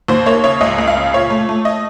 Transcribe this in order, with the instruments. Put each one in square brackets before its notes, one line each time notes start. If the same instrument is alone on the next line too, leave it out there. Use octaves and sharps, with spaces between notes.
[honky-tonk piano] D#2 C5
A#3 C#5
C#3 C#5
C#2 D#5
C#2
F5
C#3
A#2 C#5
A3
A3
D#5